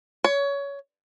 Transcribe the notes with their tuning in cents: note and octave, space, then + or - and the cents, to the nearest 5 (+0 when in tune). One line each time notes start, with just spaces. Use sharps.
C#5 +20